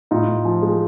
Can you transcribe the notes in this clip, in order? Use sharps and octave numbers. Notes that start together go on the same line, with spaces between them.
A2 D#4 F4
A2
F3
G#3